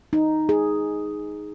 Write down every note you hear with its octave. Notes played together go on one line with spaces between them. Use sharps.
D#4
G#4